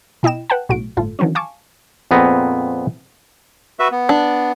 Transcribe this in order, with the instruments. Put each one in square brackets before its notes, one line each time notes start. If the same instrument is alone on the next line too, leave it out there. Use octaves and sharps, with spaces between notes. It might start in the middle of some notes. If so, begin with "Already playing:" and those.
[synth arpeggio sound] B2 E4 D#5 G5 E7
B4 F#5 G5 A5
B1 A2 F#4 D7
G1 A2 F4 A4
D#3 E3 F#3 C4 C#4
F5 G#5 A5 C#6 D6
[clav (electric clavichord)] F2 A#2 B3 C4 G#4 A#5
[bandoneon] F#4 B4 E5
B3
[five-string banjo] D4